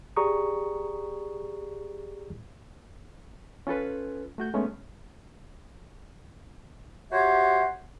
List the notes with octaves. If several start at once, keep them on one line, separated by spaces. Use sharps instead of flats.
G4 G#4 D5 A#5 C#6 D#6
C#4 F4 A4 B4
A3 F#4 G6
G#3 A3 B3 C#4
F#4 G4 C5 C#5 E5